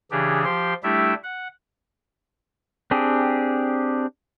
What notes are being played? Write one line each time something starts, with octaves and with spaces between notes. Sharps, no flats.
C#3 E3 D4 G4 G#4
F3 G4 C6
G3 A3 D4 E4 G4 E5
F#5
C4 D4 G4 G#4